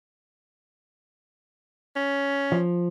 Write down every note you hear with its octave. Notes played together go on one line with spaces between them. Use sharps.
C#4
F3